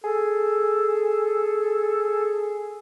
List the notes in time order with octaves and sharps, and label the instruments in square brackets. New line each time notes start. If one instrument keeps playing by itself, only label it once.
[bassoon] G#4 [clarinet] A4